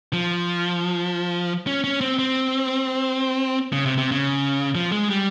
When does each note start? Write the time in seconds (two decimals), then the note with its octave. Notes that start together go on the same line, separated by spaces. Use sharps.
0.13 F3
1.67 C#4
1.84 C#4
2.01 C4
2.19 C4
3.73 C#3
3.86 C3
3.98 C3
4.12 C#3
4.75 F3
4.92 G#3
5.10 G3